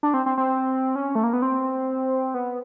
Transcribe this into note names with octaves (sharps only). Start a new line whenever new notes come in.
D4
C4
C4
C4
C#4
A3
A#3
B3
C4
B3